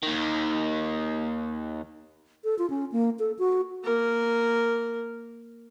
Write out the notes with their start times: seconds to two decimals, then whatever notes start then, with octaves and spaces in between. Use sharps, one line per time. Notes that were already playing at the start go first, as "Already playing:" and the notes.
0.03 D#2 D#3
2.44 A4
2.59 F4
2.70 C#4
2.92 A#3
3.19 A4
3.39 F#4
3.84 A#3 A#4